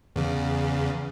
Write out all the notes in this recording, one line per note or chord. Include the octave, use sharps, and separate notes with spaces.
E2 C#3